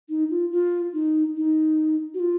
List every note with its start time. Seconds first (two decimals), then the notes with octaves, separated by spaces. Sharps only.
0.09 D#4
0.31 F4
0.52 F4
0.94 D#4
1.36 D#4
2.14 F#4
2.20 F4